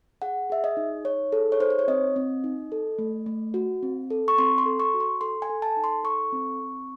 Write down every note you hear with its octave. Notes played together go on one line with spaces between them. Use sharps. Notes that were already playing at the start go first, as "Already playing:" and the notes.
G#4 F#5
G#4 E5
D#5
D#4
D#4 C#5
G#4 A4
C#5
D#4 C5
C5
C#5
C4 D#5
C4
D#4
A4
A3
A3
F#4
C4
A4
C#6
C4 C6
C6
A4
C#6
F#4
C6
A4 C6
G#5
A4
A5
D#4
C6
A4 C#6
C4
C4